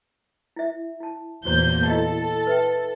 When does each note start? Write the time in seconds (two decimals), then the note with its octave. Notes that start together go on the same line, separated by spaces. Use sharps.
0.56 E4 E5
1.00 E4 A5
1.45 E2 A#2 F#4 C5 A#5 G6
1.88 E4 A4 D#5 F5
2.47 B4 E5 G5